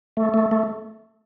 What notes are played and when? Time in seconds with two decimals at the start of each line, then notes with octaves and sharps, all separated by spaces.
0.17 A3
0.34 A3
0.51 A3